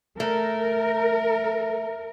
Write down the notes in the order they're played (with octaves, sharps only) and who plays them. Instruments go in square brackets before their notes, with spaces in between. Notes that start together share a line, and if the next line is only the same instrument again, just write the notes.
[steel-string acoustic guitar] A3 [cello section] A#4